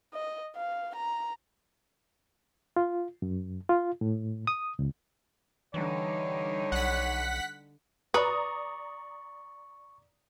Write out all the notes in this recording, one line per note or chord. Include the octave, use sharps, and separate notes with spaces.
D#5
F5
A#5
F4
F#2
F4
A2
D#6
C#2
D3 E3 G3 D#4 C#5
B1 F#5 B6
B4 D5 A#5 C#6 D#6